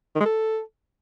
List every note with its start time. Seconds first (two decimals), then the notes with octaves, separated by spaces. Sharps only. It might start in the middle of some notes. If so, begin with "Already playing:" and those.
0.15 D#3
0.20 G#3
0.25 A4